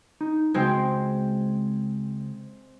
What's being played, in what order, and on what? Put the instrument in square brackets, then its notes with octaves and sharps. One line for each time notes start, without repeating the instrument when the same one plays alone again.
[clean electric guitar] D#4
[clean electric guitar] C#2 F#4 G5 [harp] G#3 C4